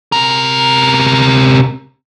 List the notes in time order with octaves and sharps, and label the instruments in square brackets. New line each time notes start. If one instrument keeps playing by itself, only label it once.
[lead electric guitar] C3 A#4